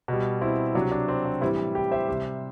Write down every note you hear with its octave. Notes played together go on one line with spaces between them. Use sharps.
B2 G3
C4 E4
C3 F#3 D4
D4
C4
D4
A2 E3 G3 C4 E4
E4 G4
C5 E5
C3 G3